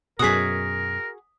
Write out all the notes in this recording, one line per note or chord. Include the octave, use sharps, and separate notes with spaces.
F#2 B2 F#4 G#4 A#4 D#6 B6